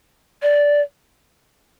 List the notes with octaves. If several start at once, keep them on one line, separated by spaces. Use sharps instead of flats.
D5